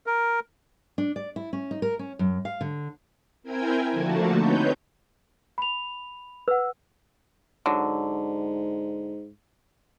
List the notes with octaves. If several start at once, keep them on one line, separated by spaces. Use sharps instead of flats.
A#4
D4
D5
E4
C#4
D#4
A#4
C#4
F#2
F5
D3
C4 E4 A#4 G5 G#5 G#6
D3 F3 A3 A#3 F#4 A5
C4 D#4 B4 C#5 G6
B5 F7
B4 F#5 E6
G#2 D3 F#3